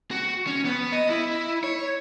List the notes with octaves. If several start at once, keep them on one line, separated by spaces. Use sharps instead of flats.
F#4
C#4
B3
D#5
E4
C#5